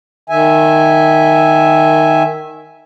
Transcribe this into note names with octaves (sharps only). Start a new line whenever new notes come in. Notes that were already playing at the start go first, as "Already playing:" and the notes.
D#3 E5 G#5